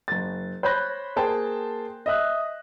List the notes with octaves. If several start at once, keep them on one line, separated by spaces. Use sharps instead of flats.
F#1 A6
C5 C#5 B5 F#6 G6 A#6
A#3 G#4 C5 G5 A5
D#5 E5 F#6